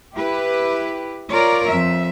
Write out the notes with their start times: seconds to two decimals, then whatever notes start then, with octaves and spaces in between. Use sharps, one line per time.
0.14 E4 G4 B4
1.30 F4 A#4 C#5 D5
1.69 F2 E5